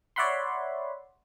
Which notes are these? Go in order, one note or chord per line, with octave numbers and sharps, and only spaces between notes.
C#5 D5 E5 F#5 B5 C6